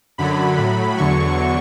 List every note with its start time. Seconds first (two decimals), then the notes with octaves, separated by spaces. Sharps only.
0.18 F#2 D3 F#3 B5
0.58 A2 F#3
0.98 E2 D3 F#3 C#6